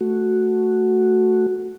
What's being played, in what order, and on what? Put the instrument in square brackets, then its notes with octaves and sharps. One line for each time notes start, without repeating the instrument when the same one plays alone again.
[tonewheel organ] A3 F#4